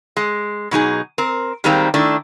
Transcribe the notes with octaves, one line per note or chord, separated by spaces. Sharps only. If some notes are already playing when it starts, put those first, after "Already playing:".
G#3
B2 F#3 D#4 G#4
C4 A#4
D#3 G3 G#3 A#3 C4 D#4
D#3 A3 D4 E4